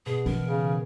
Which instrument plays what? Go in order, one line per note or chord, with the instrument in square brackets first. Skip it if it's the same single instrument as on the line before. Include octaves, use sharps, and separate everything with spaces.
[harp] B2 [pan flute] G#4
[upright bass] E3 [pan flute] A#4
[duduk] C#3